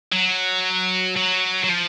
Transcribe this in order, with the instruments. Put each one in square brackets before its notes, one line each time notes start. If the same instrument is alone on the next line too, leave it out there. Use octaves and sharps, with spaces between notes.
[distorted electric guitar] F#3
F#3
F#3
F3